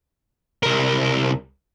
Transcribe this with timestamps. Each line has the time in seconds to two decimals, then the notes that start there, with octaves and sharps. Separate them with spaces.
0.63 C2 A#4